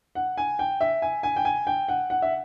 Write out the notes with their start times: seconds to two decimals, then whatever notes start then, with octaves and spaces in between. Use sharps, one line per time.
0.15 F#5
0.37 G#5
0.59 G5
0.81 E5
1.02 G#5
1.23 G#5
1.36 G5
1.45 G#5
1.67 G5
1.88 F#5
2.10 F#5
2.22 E5